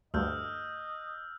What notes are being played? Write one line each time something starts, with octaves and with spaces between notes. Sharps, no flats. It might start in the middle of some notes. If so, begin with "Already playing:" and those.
D2 G2 D#5 E6 F6 G6